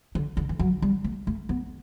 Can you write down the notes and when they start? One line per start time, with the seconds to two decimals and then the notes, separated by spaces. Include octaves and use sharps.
0.15 D3
0.37 D3
0.49 E3
0.59 F#3
0.82 G3
1.04 A3
1.27 A3
1.49 B3